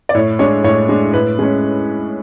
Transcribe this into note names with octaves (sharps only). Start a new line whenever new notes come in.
D5
A2 C#5
G#3 D4 C#5
A2 C#5
G#3 D4
A2 B4
G#3 C#4